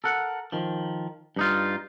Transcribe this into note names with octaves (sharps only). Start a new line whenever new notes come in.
A4 A#4 F#5
D#3 F3
G2 D#4 F4